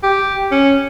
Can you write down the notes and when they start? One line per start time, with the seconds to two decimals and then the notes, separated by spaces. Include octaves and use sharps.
0.03 G4
0.51 C#4